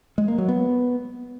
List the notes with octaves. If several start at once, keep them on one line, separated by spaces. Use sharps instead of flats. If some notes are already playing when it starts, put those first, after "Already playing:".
G#3
A#3
F#3
B3